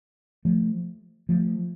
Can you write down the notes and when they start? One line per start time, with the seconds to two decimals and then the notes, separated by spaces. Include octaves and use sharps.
0.45 F3 A3
1.29 F3 A3